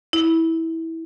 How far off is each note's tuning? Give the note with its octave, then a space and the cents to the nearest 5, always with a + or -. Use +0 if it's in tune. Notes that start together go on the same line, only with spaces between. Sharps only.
E4 -15